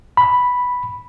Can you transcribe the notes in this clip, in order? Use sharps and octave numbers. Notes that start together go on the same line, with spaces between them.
B5